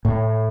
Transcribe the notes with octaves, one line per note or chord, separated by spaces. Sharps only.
A2